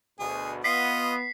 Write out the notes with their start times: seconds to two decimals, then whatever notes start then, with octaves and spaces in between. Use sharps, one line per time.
0.20 D2 B2 G#4
0.64 B3 F4 D#5 B6 C7